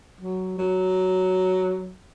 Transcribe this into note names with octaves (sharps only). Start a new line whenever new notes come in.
F#3
F#3